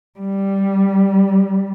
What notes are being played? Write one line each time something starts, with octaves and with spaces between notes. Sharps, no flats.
G3